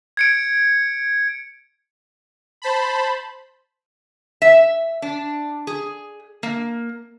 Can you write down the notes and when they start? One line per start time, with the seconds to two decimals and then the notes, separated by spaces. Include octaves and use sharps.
0.17 G#6 C#7 D7
2.62 C5 A5 B5
4.42 E5
5.02 D4
5.67 G#4
6.43 A#3